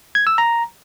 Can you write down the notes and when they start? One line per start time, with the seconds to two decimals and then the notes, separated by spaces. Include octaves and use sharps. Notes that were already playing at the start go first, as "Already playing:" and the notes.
0.15 G#6
0.27 E6
0.38 A#5